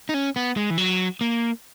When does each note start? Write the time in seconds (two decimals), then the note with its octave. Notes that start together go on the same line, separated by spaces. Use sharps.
0.09 D#4
0.14 C#4
0.36 B3
0.57 G#3
0.70 E3
0.78 F#3
1.21 A#3